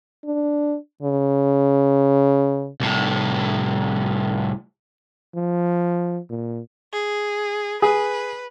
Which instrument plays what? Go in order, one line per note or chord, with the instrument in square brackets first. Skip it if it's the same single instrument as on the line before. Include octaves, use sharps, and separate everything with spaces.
[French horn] D4
C#3
[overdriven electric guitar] C2 A2
[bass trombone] F3
A#2
[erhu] G#4
[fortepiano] G#4 [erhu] B4